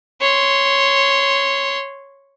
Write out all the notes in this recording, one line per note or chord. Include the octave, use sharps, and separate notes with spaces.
C#5 C6